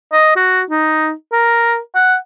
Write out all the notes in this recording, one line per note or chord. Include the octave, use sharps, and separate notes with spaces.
D#5
F#4
D#4
A#4
F#5